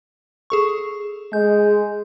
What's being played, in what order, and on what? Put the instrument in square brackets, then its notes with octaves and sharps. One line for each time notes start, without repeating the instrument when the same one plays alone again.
[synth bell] G#4 A4 C#6
[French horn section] G#3 G#4 [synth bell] G6